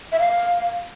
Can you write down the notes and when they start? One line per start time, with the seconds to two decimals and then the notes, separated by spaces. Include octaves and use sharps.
0.12 E5
0.20 F5